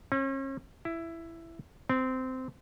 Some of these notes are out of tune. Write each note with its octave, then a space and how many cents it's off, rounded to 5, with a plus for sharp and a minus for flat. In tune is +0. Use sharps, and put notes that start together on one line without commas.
C#4 -40
E4 +10
C4 -15